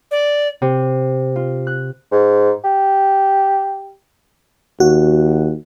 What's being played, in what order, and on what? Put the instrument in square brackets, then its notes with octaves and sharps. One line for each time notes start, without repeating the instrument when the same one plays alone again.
[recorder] D5
[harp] C3
F4
F#6
[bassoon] G#2
G4
[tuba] D#2 [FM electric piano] F#4